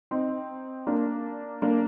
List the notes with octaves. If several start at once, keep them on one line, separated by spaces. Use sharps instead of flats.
C4 D#4
A#3 D4
A#3 D4